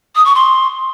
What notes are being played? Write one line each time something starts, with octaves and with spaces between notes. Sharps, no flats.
D#6
C#6
C6